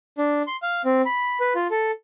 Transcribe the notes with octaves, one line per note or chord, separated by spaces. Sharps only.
D4
C6
F5
C4
B5
B4
F4
A4